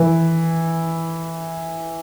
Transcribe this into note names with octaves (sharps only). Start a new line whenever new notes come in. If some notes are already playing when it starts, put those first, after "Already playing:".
Already playing: E3